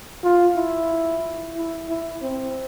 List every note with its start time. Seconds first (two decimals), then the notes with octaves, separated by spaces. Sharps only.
0.24 F4
0.56 E4
1.56 E4
1.89 E4
2.22 C4